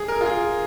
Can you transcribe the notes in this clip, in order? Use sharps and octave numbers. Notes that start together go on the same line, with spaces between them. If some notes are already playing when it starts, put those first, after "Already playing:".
Already playing: G#4
A#4
F4
G#4